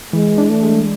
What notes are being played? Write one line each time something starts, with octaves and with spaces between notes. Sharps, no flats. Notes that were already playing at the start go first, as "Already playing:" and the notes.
E3 G#3
D4
A3
G#3